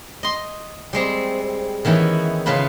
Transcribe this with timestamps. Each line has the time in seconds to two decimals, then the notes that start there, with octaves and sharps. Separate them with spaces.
0.23 D#5 C6
0.93 G3 G#3 C4
1.85 D#3 E3 B3 C#4 E4
2.46 C#3 B3 F4 B4 A5 B5